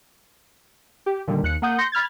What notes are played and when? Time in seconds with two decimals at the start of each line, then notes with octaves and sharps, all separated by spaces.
1.06 G4
1.28 A#2 D3 D#3 G3
1.43 D#2 F#6 C#7
1.62 A#3 F#5 D#6 G6
1.78 C6 G6 A#6 C#7
1.92 B5 F6 G#6 A6